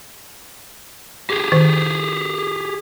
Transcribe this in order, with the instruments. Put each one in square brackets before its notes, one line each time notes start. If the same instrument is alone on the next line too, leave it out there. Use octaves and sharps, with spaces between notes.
[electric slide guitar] G4 G#4
[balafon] D#3